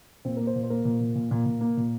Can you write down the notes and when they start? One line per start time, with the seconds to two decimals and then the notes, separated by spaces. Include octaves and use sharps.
0.25 A#2 C4
0.37 A#3 A#4
0.47 C5
0.55 A#2
0.63 C5
0.70 A#3 A#4
0.85 A#2
1.00 A#2
1.15 A#2
1.31 A#2
1.46 A#2
1.61 A#3
1.77 A#2